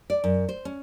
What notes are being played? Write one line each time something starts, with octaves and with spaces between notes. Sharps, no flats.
D5
F#2
C5
C#4